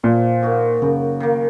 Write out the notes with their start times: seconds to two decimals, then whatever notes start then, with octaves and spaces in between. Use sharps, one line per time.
0.03 A#2 F3
0.42 A#3 D#4 F#4
0.82 F#2 C#3
1.20 D#3 A#3